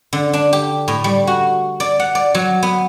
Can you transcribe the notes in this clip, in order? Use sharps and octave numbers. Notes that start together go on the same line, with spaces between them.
D3
D4
G4
A2
G3
F#4
D5
F#5
D5
F#3
B3